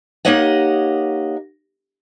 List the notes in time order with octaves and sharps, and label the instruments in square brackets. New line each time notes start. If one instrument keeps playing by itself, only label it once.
[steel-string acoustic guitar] A#3 D#4 G4 C#5 D#5 F#5